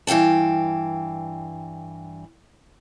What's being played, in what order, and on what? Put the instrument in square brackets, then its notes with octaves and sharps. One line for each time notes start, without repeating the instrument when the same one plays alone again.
[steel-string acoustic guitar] G2 E3 F5 G5 A5